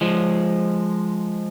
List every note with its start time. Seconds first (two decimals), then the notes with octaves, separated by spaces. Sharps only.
0.01 F3 G#3